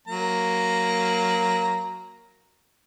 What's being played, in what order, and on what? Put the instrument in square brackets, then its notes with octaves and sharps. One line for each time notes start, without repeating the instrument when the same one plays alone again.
[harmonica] F#3 A#3 A#5